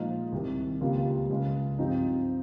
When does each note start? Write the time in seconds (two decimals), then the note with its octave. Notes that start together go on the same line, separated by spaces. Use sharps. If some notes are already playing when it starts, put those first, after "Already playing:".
Already playing: A#2 F3 G#3 D#4
0.32 C2 C3 D#3
0.81 C#2 C#3 G3 A#3 F4
1.29 C#2 C#3 G#3
1.79 G2 F3 C4 D#4